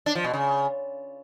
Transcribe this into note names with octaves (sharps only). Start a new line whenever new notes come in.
D4
F3
B2
C#3